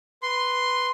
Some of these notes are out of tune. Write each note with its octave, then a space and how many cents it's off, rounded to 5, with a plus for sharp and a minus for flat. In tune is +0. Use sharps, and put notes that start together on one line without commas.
B4 +0 C6 +0